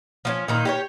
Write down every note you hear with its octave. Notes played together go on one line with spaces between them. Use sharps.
F3 A3 C#4
A#2 D#3 D#4
G4 A#4 C#5